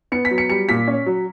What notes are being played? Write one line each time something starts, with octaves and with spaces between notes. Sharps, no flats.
B3 C#7
B6
F#3
C#7
G3 C#7
A#2 B6
C#4
F#3